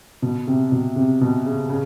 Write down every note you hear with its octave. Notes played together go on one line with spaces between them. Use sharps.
B2
C3
B2
C3
B2
C#3
C#3